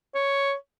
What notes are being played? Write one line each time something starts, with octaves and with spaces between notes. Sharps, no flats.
C#5